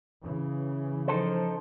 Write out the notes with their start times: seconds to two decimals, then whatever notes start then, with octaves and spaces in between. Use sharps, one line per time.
0.23 C#3 E3
1.08 F3 D#4 A4 C5